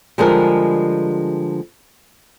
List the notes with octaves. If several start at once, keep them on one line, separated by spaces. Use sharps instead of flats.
D3 F3 G3 G#3 G#4 A#4